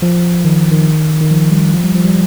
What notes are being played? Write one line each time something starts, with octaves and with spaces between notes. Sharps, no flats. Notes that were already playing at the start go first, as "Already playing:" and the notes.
F3
D#3
D#3
D#3
F3
G3
F3
G3
F3
G3